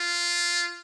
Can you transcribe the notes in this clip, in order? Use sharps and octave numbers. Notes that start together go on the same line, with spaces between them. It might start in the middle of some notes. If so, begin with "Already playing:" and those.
Already playing: F4